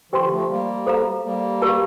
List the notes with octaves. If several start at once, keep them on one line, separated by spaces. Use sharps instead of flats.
D3 F3 G4 C5 G5 C6
F3 A3
G3 A#3
A4 C5 F5 A#5
G3 A#3
G4 A#4 F5 A5